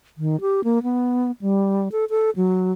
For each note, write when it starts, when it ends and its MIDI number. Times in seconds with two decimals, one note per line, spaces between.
0.18 0.40 51
0.41 0.64 67
0.64 0.82 58
0.83 1.31 59
1.41 1.88 55
1.92 2.05 69
2.10 2.30 69
2.36 2.72 54